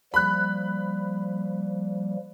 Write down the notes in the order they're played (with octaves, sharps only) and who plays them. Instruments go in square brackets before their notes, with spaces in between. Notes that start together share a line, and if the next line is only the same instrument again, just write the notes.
[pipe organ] F3 G3 A#3 [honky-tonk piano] B5 F#6